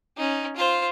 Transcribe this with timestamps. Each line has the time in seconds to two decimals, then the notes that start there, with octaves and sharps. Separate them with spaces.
0.17 C#4 D#4
0.56 F4 C5